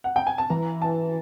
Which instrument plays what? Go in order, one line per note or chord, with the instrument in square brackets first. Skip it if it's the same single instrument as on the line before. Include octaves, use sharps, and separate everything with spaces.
[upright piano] F#5
G5
G#5
A5
[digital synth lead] E3 [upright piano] A#5
[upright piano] A5